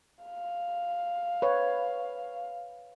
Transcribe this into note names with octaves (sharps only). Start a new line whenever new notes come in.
F5
B4 C#5